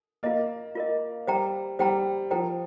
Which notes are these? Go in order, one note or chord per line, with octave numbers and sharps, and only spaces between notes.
A#3 F4 A#4 D#5
F4 A#4 D#5
G3 C5 G5 A#5
G3 C5 G5 A#5
F3 C5 G5 A#5